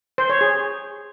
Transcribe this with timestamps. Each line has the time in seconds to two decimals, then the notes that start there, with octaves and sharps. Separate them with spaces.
0.18 C5
0.30 C#5
0.41 G#4